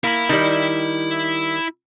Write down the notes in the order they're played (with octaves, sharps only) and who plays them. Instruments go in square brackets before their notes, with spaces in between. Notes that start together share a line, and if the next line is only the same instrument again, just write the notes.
[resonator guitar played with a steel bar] A#3 [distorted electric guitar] E4 B5
[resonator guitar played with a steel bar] D#3 G3